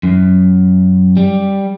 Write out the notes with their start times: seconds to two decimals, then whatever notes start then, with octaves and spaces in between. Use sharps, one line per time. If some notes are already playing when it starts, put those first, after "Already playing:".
0.03 F#2
1.17 G3